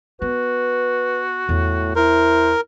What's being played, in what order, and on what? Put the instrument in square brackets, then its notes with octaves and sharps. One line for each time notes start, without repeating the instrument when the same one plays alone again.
[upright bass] B3 [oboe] F#4 [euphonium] B4
[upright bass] E2 [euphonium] A2
[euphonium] E4 [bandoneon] A#4 [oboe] C5